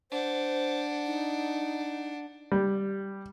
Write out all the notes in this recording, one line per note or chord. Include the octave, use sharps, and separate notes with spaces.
D4 C5 F#5
D#4
G3